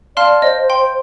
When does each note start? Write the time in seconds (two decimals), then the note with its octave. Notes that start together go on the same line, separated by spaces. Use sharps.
0.16 D5 F5 A5 C6 F6
0.42 C5 D#5
0.61 C5
0.70 G5 C6
0.78 C5